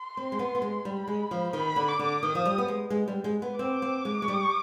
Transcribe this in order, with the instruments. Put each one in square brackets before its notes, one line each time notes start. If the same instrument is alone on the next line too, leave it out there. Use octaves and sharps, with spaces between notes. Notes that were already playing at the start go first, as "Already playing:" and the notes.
Already playing: [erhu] C6
[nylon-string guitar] C4
G#3
B3
B3
G#3
[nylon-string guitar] G3 [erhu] B5
[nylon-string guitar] G#3
F3
[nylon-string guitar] D#3 [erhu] B5
[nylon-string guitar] D3
[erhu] D6
[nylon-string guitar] D3
[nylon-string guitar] D#3 [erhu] D#6
[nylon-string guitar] F3
G3
B3
G#3
G#3
G3
G#3
B3
[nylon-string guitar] C4 [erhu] D6
[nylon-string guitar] C4
G#3
G#3
G3